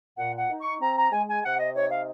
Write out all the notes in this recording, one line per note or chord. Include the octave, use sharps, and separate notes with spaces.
A#2 F#5
F#5
D#4
C#6
C4 A#5
A#5
G#3 G#5
G#5
C3 F#5
D#5
D#4 C#5
F5